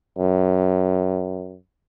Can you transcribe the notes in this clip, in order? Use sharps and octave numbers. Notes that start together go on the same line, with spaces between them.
F#2